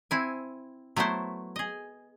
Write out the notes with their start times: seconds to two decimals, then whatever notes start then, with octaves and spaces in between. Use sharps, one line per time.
0.11 C4 E4 G#5
0.96 F#3 A3 B3 E4 C5
1.56 G#4 D#5